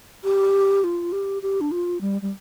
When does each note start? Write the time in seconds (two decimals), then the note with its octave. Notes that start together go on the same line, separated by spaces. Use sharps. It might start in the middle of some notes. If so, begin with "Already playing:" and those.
0.24 G4
0.84 F4
1.12 G4
1.42 G4
1.61 D4
1.71 F4
2.01 G3
2.22 G3